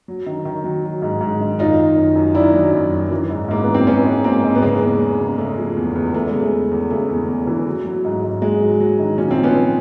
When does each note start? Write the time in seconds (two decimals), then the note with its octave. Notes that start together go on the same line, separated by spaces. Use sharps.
0.08 F#3
0.26 D#3
0.45 D#3
0.64 F#3
0.84 F#3
1.02 G#2
1.21 G#2
1.41 D#3
1.59 F#2 D#4 F4
1.78 D#3
1.97 F#2
2.16 F#2
2.35 D#3 D4 E4
2.54 F#3
2.73 F#2
2.93 F#2
3.11 E3
3.30 G#2
3.48 G#2 A#3
3.63 E3 B3
3.74 C4
3.87 G#2 B3 C#4
4.05 G#2
4.24 G#2 A#3 C4
4.44 G#2
4.55 B3
4.62 C#3 G#3 A#3
4.82 E2
5.00 E2
5.20 C#3
5.38 C#3 A3
5.58 F3
5.76 E2
5.95 E2
6.14 E2 A3
6.27 G#3
6.33 C#3
6.40 A3
6.52 E2
6.71 E2
6.90 C#3 A3
7.09 E2
7.29 E2
7.47 E3
7.66 F#3
7.85 F#3
8.05 G#2
8.23 G#2
8.42 G#2 G#3
8.61 F#3
8.80 F#3
8.99 D#3
9.18 A#2 C#4
9.31 C4
9.37 F3
9.43 B3 C#4
9.56 F3